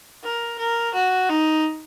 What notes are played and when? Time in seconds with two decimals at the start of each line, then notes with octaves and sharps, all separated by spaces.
0.24 A#4
0.58 A#4
0.94 F#4
1.29 D#4